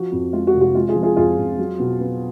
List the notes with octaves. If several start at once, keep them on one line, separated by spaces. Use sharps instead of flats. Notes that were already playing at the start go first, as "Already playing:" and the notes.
Already playing: F3 F#4
F2
G#3 F4
F#4
F1
F#4
G#3 F4
F4 G#4
F3
F4 G#4
F2 F4 G#4
F2
F#3
B2
B3